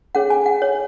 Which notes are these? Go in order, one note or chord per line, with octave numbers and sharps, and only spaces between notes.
C#4 G#4 C#5 F#5
G#5
F#5
C#5